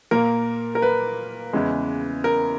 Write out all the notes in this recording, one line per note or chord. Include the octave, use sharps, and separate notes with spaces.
A#2 A#3 A#4
A#4
B4
E2 C#3 G#3
A#4